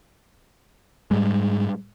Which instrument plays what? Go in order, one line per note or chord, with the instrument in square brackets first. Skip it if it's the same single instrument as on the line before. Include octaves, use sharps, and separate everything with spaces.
[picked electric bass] G#2 G3 G#3